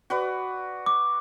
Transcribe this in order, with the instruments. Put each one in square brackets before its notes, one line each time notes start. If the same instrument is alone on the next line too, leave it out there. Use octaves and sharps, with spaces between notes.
[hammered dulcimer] F#4 B4 D5
[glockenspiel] D6